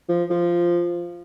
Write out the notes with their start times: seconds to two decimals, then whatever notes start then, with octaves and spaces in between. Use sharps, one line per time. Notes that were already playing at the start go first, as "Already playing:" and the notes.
0.09 F3
0.30 F3